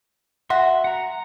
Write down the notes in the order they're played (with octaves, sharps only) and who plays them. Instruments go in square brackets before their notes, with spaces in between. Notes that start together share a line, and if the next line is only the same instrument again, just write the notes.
[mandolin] F#4 [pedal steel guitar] E5 C6
[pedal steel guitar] F#5 A#5